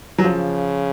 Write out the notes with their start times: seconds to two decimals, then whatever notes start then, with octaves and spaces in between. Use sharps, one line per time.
0.18 F#3
0.24 C#3 F3